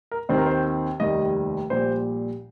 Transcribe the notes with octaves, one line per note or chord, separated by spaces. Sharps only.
A#4
D#2 D#3 C4 C5
A#4
C5
F1 D#2 D#3 G3 D#5
A#1 A#2 G3 C5